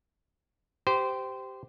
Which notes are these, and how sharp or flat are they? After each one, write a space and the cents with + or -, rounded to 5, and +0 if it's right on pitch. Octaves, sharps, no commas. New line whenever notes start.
G4 -10 C5 -20